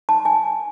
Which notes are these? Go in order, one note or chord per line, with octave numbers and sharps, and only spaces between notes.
A5
G#5